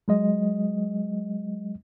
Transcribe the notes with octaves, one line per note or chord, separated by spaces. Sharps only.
F#3 G#3 D#5